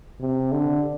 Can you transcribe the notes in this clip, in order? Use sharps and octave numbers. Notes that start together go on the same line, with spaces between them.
C3
D3